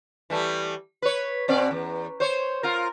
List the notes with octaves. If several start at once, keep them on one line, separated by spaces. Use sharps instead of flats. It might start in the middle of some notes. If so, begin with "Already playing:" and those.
E3 G3 A3
B4 C#5
B2 C4 D5
E2
C5 C#5
F4 A#4